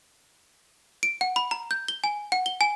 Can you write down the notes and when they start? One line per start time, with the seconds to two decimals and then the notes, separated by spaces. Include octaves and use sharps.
1.03 D7
1.21 F#5
1.36 B5
1.51 A#5
1.71 G6
1.88 G7
2.04 G#5
2.32 F#5
2.46 G7
2.61 G#5